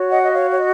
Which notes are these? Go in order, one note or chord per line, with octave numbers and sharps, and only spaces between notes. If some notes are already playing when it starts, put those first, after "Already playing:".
Already playing: F#4 C#5
D#5 F#5
D#5
C#5 F5
C#5
D#5